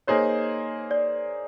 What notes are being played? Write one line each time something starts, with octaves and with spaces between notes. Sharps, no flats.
A#3 D#4 G#4 C5 C#5
D5